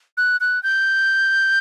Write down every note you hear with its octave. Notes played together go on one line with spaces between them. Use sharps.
F#6
F#6
G6